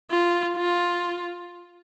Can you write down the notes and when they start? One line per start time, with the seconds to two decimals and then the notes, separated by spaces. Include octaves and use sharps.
0.11 F4
0.57 F4